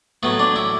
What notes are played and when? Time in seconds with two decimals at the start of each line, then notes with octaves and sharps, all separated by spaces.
0.23 A2 F#3 B3
0.39 D4
0.56 E4